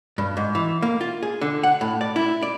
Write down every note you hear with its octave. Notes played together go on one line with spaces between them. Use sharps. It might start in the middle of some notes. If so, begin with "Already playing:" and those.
G2
G#2
E3
A#3
F4
G#4
D3
F#5
A2
D5
E4
D5